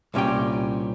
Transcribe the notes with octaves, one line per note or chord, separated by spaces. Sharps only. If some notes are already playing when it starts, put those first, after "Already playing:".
C2 A#2 C#4 G4 G5